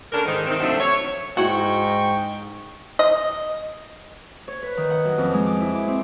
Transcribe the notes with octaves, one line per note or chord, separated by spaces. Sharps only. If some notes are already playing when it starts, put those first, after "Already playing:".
C#3 D4 A4 A#4
G#2 D#3
C3 D#3 C4
C3 F3 F#3 A3 C4 D4
C#5
G#2 E4 F#4 D#5 G5 C#6
D#5
C#5
B4
D#3
F#5
F#2
F2
G#3
D6
E4
D6
C4